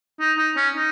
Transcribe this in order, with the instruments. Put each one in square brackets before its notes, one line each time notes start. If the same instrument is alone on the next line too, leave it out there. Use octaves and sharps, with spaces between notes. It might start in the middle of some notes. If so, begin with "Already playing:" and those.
[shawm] D#4
D#4
C#4
D#4